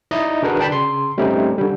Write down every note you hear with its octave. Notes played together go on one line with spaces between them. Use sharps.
D#4 E4 D5 D#5
D3 D4 F#4 G#4 A#4 B4
D4 G5 A5 B5
C#3 C6
G3 A3 C4 C#4 D#4 G4
D3 G3